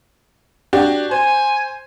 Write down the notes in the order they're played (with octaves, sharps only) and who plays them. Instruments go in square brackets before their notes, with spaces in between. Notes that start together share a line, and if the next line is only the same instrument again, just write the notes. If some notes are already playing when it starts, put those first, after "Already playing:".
[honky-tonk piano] D4 F#4 G4
[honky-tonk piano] C5 [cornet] G#5